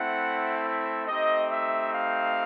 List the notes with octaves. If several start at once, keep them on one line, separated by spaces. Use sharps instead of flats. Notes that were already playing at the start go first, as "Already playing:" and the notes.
Already playing: A3 C4 E4 F#5
E5
A3 C4 D#4 G4 D#5
E5
F5